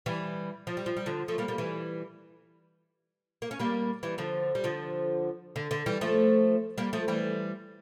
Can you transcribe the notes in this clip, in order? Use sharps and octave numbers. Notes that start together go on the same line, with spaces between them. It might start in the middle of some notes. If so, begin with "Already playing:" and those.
E3 G3
F3
G3
F3
G3
D3 F3
F3 A3
G3 A#3
G3 A#3
E3 G3
A#3
C#4
G3 A#3
E3 G3
D3 F3
G3
D3 F3
D3
D3
E3 G3
F3 A3
G3 A#3
F3 A3
E3 G3